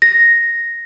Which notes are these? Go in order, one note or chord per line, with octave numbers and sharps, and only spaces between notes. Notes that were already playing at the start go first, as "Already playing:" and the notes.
A#6